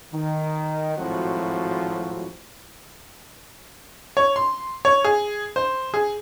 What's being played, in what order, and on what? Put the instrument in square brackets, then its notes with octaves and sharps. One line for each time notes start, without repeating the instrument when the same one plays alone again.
[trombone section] D#3
G#1 A2 F3 F#3 C4 F#4
[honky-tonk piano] C#5
C6
C#5
G#4
C5
G#4